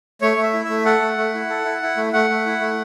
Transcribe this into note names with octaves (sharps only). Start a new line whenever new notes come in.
A3 C#5
A3
E5
E4
E5
A3
A4 F#5
A3
A3
E4
A4
E4
E4
A3
A3 F#5
A3
E4
A3